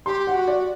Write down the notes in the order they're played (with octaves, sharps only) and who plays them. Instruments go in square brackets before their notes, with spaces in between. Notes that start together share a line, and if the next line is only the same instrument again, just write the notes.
[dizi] G4 [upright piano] C6
[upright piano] F#5
[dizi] F#4
[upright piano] D5